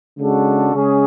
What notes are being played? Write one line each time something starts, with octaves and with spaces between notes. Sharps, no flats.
C#3 G#3 D4 F#4 A4
C#3 G#3 C#4 G#4